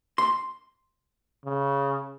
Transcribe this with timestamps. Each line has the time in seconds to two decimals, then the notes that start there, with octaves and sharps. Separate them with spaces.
0.18 C6
1.45 C#3